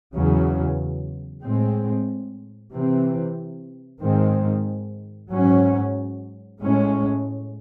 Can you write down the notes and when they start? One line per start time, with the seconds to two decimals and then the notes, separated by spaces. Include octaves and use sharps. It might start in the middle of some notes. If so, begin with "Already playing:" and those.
0.13 E2 C#3 F#3
1.43 A2 G#3 C4
2.72 C3 E3 C4
4.01 G#2 D#3 G#3 C4
5.30 G#2 F#3 C#4
6.59 A2 G#3 C#4